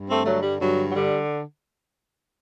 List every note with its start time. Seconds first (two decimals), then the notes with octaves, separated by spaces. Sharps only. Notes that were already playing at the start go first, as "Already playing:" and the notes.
Already playing: G2
0.09 A3 C4
0.25 D3 F#3 A3
0.42 G3
0.59 G2 F#3
0.90 F#3
0.93 D3 G3